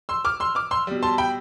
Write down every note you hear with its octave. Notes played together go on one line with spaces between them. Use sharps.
C6 E6
D6 F6
C6 E6
D6 F6
C6 E6
B2 G3
A5 C6
G5 B5